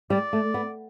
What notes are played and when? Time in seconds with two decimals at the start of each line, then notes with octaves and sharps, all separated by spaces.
0.10 G3 D5
0.33 A3
0.54 B3